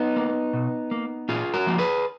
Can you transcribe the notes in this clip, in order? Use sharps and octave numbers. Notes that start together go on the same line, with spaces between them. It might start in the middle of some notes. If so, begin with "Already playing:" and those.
Already playing: B3 D#4
A#3
B2
A#3
A#2 F4 G#4
F#4 A#4
F3 A#3
G#4 B4